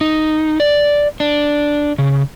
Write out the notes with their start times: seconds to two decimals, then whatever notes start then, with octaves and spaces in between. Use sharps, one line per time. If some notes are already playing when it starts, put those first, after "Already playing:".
0.01 D#4
0.60 D5
1.20 D4
1.98 C#3